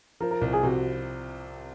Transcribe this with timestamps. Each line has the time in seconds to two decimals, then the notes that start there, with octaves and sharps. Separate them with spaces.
0.20 F3 A#4
0.31 A#4
0.41 C2
0.53 G#4
0.63 C3 F#4